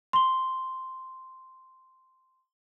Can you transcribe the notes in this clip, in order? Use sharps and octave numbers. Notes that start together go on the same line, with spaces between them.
C6 G7